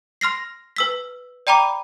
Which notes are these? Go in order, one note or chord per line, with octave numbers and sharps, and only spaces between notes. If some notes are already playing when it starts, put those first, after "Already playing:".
C6 F6 A#6 C7
B4 E6 B6
D5 G5 A#5 B5 D6